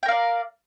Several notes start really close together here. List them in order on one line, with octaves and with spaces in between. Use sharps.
G5 A#4 F5 D5